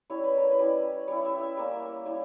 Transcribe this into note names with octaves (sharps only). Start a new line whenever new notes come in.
G3 C#4 E4 C#5
B4
A#4
B4
G3 C#4 E4
G3 C#4 E4 C#5
E5
E5 G5
G3 A#3 C#4
G3 C#4 E4 E5